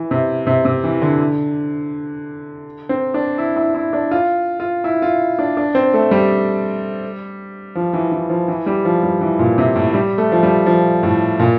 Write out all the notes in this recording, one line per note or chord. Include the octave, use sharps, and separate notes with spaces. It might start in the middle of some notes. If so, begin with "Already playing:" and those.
Already playing: E3
C3
C3
C3
E3
D3
C4
D4
E4
E4
E4
D4
F4
F4
E4
F4
D4
D4
C4
A3
G3
F3
E3
E3
F3
E3
G3
F3
G3
E3
A#2
C3
A2
G3
A3
F3
G3
F3
A2
A#2